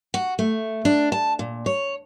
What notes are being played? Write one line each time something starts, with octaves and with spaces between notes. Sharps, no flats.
F#4
A3
D4
A5
A#2
C#5